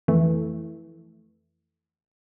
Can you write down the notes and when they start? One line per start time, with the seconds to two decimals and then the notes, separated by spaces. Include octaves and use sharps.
0.08 F2 E3 A3